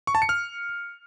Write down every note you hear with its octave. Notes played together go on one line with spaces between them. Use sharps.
C#6
A5
C#7
F6